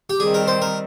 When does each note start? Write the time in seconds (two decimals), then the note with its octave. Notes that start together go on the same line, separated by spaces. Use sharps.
0.10 G4
0.19 D#3 G3 C4 G#4
0.34 A#4
0.48 C5
0.62 A#4